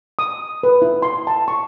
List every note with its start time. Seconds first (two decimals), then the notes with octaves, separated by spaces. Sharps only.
0.19 D#6
0.63 B4
0.82 E4
1.02 C6
1.27 A5
1.48 C#6